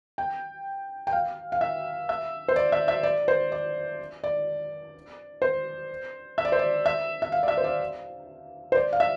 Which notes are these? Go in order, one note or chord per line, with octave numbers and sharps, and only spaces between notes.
G5
G5
F5
F5
E5
E5
C5
D5
E5
E5
D5
C5
D5
D5
C5
E5
D5
C5
D5
E5
E5
F5
D5
E5
C5
D5
C5
D5
F5
E5